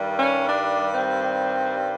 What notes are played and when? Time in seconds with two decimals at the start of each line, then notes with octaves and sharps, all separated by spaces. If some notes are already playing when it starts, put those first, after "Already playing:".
Already playing: G2 D#3 G3
0.19 C#4
0.48 D4
0.92 C4